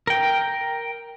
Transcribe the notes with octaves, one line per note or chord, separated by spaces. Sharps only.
A#4 G5